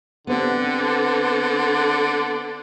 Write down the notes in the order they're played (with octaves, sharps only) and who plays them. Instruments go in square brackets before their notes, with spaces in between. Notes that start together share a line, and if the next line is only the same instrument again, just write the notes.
[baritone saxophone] D3 [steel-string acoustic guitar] B3 C4 G4